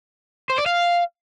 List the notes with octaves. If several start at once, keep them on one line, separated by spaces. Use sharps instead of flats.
C5
D5
F5